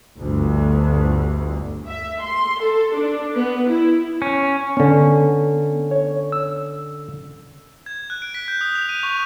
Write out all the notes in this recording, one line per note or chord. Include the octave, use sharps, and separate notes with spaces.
G1 D2
E5
C6
A4
D4
B3
E4
C#4
D3 B3 C#4
C#5
E6
G#6
F#6
D7
B6
G6
D#6
F7
D#7
C#6